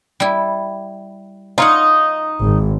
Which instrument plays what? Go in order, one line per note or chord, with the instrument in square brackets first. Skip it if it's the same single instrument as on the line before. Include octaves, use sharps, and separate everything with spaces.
[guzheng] G3 E4
[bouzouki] D#4 [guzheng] F4 C#5 F#5
[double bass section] G#1